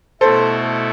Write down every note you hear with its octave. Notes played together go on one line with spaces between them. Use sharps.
B2 A3 E4 A4 C5